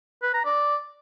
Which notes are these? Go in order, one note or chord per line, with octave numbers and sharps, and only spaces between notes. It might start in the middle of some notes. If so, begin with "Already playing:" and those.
B4
A#5
D5